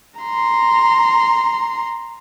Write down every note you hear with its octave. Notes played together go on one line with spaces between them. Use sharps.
A#5 C6